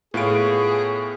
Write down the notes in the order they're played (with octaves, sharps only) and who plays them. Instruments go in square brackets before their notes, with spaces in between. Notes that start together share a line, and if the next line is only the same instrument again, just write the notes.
[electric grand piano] A2 D7 [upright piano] B3 F4 C#5 [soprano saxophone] G#4